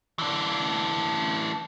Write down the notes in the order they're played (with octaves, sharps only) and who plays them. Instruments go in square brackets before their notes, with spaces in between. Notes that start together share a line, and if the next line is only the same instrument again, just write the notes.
[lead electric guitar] E3 D4